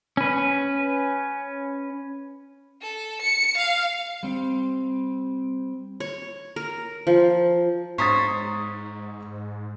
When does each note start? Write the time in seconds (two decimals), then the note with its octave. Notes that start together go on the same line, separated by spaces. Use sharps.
0.17 C#4 B4
2.81 A4
3.21 C#7
3.57 F5
4.23 G3 C4
6.00 C#5
6.56 A#4
7.07 F3
7.98 G#2 C5 C#5 A#5 B5 D#6 A6